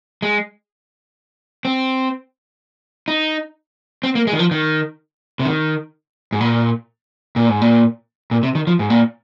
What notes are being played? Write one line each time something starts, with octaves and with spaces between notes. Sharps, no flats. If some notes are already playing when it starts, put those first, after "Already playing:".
G#3
C4
D#4
C4
A#3
G#3
D#3
F3
D#3
C3
D#3
G#2
A#2
A#2
G#2
A#2
A#2
C3
D#3
F3
G#2
A#2